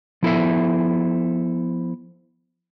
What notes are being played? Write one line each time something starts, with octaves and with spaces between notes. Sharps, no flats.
F3 B3 E4 A4 C5 E5